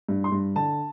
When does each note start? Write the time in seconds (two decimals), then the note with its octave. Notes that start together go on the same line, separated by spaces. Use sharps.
0.09 G2
0.24 C6
0.32 G2
0.56 D3 A5